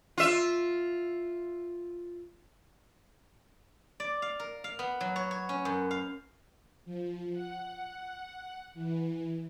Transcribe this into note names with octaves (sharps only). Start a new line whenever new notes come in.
F4 E5
D5
F5
A#4
F5
B3
F#3
C#5
C#5
C#4
F#2
F5
F3
F#5
E3